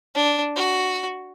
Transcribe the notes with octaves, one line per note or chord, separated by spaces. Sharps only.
D4
F#4